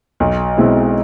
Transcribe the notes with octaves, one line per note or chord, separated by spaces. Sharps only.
B1
B2 G#3 C4 E4